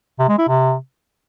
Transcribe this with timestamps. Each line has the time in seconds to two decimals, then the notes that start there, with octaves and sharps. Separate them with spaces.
0.19 C3
0.29 G#3
0.38 E4
0.48 C3